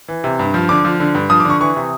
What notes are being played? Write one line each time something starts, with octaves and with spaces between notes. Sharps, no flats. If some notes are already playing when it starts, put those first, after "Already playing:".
E3
C3
G2
F3
D3 D6
F3
D3
G2
F3 D#6
D6
D3 C#6
E3 C#6
C3